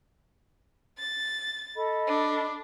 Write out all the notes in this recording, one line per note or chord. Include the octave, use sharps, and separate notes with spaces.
A6
A4 D#5 B5
D4